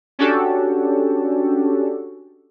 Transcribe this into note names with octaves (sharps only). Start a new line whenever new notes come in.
C#4 D4 F#4 G4 A4